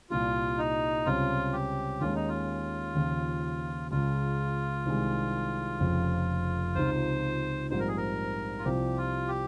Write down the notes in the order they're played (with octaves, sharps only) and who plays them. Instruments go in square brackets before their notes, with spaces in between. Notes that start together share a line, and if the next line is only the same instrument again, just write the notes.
[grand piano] C2 A#2 G3 [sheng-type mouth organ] F4
[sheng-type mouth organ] D#4
[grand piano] C#2 C3 G3 C#4 [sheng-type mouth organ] F4
[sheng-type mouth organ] G4
[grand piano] D#2 D#3 G#3 C#4 [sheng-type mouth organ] F4
[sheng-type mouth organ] D#4
F4
[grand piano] D#2 C#3 F3
[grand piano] C#2 C#3 G#3 [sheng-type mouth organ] F4
[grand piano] C2 C3 D#3 G#3
F1 F2 C#3 F3
[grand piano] C#2 C3 F3 C4 D#4 [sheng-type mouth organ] C5
[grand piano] A#1 G#2 G3 C4 D#4 [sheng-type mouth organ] C5
[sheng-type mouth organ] A#4
G#4
A#4
F4
[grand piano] C2 C3 F3 C4 [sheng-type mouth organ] G4
[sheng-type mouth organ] F4
G4